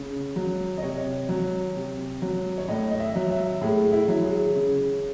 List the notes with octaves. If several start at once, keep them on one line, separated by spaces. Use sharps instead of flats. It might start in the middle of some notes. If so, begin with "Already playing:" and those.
Already playing: C#3
F#3
D#5
C3 C#5
F#3
C3
F#3
C#5
A2 D#5
D#5
E5
F#3
E5
A2 G#4
E4
F#3
G#4
C#3